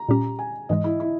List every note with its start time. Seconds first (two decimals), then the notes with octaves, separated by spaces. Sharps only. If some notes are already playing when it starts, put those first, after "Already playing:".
Already playing: A#5
0.09 A#2 G3 C#4 G4
0.39 G#5
0.69 G#2 E3 G#3 D#5
0.84 E4
1.00 E4